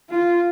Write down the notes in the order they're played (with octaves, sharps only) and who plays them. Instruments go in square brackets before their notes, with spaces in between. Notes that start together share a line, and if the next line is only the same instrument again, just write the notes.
[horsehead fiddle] F4